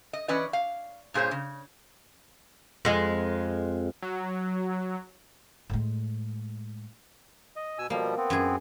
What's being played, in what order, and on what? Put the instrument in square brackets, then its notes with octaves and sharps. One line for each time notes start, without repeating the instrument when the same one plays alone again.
[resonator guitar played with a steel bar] D#5
E3 C#4 B4 D5 D#5
F5
G2 A#2 G#4 C5 C#5
C#3
[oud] F2 G#3
[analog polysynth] F#3
[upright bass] A2 G#3
[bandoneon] D#5
B2 G#5 E6
[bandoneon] B2 F3 G3 [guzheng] A#3
[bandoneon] B3 C4
[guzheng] F#2 G#4